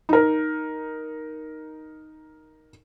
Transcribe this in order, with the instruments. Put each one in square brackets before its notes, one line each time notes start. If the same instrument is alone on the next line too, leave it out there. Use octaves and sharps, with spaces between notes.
[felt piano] D#4 A#4